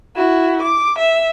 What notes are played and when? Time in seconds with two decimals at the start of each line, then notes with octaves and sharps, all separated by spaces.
0.16 E4 F#4
0.62 D6
0.99 E5